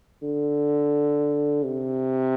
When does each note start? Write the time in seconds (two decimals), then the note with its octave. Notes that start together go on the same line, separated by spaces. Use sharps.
0.22 D3
1.63 C3